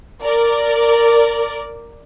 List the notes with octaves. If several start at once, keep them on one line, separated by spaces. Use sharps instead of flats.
A#4 D5